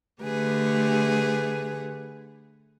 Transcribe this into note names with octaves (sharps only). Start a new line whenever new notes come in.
D3 A3 G4 G#4 B4